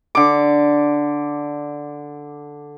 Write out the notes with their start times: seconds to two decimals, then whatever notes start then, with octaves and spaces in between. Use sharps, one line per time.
0.15 D3 D6